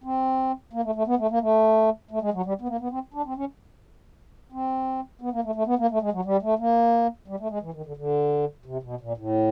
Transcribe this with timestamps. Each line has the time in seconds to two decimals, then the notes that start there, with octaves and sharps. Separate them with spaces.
0.04 C4
0.73 A#3
0.84 A3
0.95 A3
1.07 B3
1.19 A3
1.31 A#3
1.41 A3
2.11 A3
2.22 G#3
2.34 F#3
2.45 G3
2.61 B3
2.69 A#3
2.80 B3
2.91 C4
3.14 D4
3.26 C4
3.37 C#4
4.52 C4
5.21 B3
5.32 A#3
5.44 A3
5.55 A3
5.67 B3
5.79 A#3
5.91 A3
6.02 G#3
6.13 F#3
6.25 G3
6.42 A3
6.59 A#3
7.28 G3
7.40 A3
7.50 G#3
7.62 E3
7.74 D#3
7.86 D3
7.97 D3
8.66 C3
8.83 B2
9.01 A#2
9.18 A2